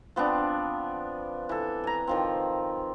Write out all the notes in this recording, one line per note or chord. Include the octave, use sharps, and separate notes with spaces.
F3 B3 C4 D4
E3 A4
G#5 A#5
D#3 F3 C4